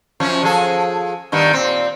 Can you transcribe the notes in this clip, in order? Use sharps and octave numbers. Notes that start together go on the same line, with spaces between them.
F#2 F3 C#4
F3 G#4 A4
G2 D#3 B3
A#2 C4